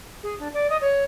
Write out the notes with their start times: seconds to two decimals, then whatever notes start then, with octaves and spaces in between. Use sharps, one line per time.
0.23 G#4
0.40 D4
0.54 D5
0.70 D#5
0.81 C#5